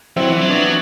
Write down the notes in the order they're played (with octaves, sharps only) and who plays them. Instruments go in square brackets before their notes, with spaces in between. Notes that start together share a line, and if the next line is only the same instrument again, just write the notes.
[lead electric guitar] F#3 [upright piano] C4 E4
[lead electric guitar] E3 [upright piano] C4 E4
[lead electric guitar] F#3
[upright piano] B3 D4